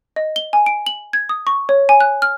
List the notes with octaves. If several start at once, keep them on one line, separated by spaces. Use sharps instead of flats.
D#5
G7
G#5
D7
F#7
G#6
D#6
C#6
C#5
G#5
F#6
F6